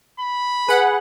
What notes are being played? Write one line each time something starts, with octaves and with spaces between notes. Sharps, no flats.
B5
G#4 B4 F#5